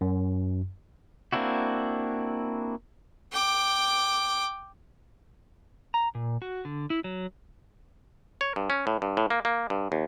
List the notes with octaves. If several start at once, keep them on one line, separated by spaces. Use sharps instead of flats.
F#2
A#3 C4 D4 E4 F#4
G5 D6
A#5
A#2
F#4
D3
E4
F#3
C#5
G2
C#4
A2
G2
A2
A#3
A#3
G2
D#2